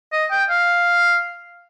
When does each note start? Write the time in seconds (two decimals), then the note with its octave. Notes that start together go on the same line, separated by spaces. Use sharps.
0.13 D#5
0.31 G5
0.50 F5